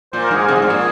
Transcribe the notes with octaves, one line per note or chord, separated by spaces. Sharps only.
A#2 C5
A#4
G#2 G#4
C3 A#4
A#2
G#2
A#2 G#4